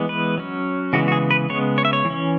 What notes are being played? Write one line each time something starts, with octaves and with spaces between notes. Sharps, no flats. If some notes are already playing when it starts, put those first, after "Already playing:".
Already playing: E3 G#3 B3
B4
F#3 C#4
C#3 E3 G#3 B3 F#4
F#4
G#4
B4
C#3 G#3 B3 C#5
C#5
E5
C#5
E3
C#4